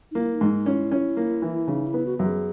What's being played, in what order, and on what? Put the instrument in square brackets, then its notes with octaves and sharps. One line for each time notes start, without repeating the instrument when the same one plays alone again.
[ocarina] D#4
[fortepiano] A#3 [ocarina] E4
[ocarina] D#4
[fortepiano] G#2
[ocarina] D#4
[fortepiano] C#4
[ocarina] E4
[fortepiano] C#4
A#3
E3
[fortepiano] C#3 [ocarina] D#4
[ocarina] E4
[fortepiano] B3
[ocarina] F#4
[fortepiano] F#2 [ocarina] F#4
[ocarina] G#4